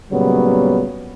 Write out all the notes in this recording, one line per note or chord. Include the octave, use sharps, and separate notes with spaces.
A#2 C#3 F#3 G3 B3